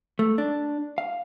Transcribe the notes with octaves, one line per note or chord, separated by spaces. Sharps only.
A3
D4
F5